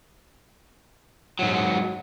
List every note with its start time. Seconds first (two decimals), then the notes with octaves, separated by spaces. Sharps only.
1.39 G#2 F#3